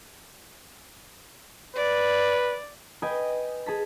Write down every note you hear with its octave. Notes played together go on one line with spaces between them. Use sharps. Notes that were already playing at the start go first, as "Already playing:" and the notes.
B4 D5
B4 D#5 G5 G#5
G#4 A5 B6